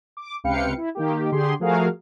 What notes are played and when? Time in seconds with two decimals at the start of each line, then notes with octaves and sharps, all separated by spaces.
0.17 D6
0.44 C#2 C3 B4 F5 G5 C#7
0.77 E4
0.95 D#3 A#3 G4
1.32 D3 G4 G#4 C6
1.60 F3 A3 F#4 G#4 A#4 F5